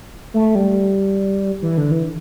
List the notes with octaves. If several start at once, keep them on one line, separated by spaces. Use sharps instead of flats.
A3
G3
E3
D3
E3